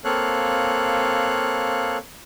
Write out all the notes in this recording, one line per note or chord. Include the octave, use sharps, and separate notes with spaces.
A#3 C4 A4 C#5 F5 F#6